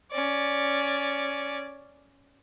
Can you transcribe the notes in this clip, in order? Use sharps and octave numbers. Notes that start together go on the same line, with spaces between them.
C#4 D5